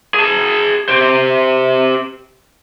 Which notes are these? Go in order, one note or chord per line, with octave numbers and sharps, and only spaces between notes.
G#4 A5
G4 C5